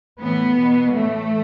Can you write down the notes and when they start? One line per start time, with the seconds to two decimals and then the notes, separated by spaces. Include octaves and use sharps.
0.19 A2 E3 B3
0.57 B2
0.94 A2 E3 A3